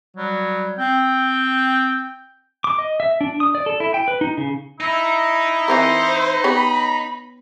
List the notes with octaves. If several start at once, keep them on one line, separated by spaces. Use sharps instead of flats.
F#3 G3
C4 G5
D6
D#5
E5
D4
D#6
D5
A4
E4
G5
B4
D#4
C#3
D#4 E4
E3 C4 A#4 C5
B3 G4 C#5 B5